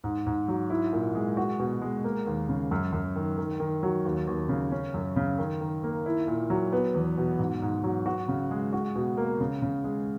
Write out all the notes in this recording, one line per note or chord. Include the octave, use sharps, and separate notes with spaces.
G#2
G#2
F#3
E4
A#2
G#3
F#4
B2
G#3
A#3
D#2
C#3
F#2
F#2
D#3
D#3
D#3
F#3
D#2
D#2
C#3
C#4
F#2
C#3
D#3
D#3
A#3
E4
A#2
F#3
B3
E2
B2
G#2
G#2
F#3
F#4
C#3
G#3
F#4
B2
A#3
C#3
C#3
G#3